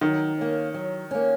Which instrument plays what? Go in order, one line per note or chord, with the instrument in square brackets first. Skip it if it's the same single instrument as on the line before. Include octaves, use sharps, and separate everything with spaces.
[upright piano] D#3 [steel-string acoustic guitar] F#3
[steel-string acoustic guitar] A#3 C#4
F#3
A#3 C#4